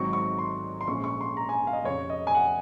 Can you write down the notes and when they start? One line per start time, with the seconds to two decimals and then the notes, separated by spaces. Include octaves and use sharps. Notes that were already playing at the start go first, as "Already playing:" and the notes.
Already playing: G#1 G#2 F#3 C4 C#6
0.13 C#6
0.39 C6
0.81 C6
0.88 A#1 A#2 G#3 C#4 C#6
1.04 C#6
1.21 C6
1.37 A#5
1.49 G#5
1.67 F5
1.73 D#5
1.84 F1 F2 C#3 C#5
2.10 D#5
2.27 G#5
2.34 F#5